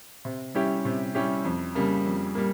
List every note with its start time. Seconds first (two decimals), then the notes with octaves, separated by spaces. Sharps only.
0.25 C3
0.54 G3 C#4 E4 G4
0.85 C3
1.15 G3 C#4 E4 G4
1.45 F2
1.75 C#3 G3 A#3
2.06 F2
2.35 G3 A#3